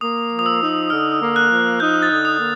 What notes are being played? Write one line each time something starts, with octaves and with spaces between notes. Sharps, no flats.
A#3 D#6
F3
D#6
E6
D#4
D3 F6
A#3
F#6
F3
D#4 G6
A6
D3
D#6
A#3